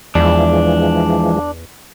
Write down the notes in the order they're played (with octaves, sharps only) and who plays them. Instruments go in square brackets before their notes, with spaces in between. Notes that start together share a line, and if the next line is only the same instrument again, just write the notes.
[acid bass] E2 [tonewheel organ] E3 F3 G#3 [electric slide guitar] D4